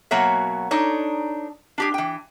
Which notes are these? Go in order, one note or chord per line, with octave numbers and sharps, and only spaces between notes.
B2 F#3 A#3 F#4 C#5 E5
D4 D#4 A4 C#5
D4 G4 G#4
E3 G5